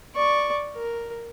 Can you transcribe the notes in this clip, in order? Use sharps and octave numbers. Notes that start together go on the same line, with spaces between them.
D5 C#6
A#4